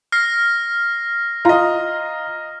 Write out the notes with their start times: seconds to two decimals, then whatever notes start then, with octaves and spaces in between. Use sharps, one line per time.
0.12 F6 A#6 C7
1.45 F4 D#5 A#5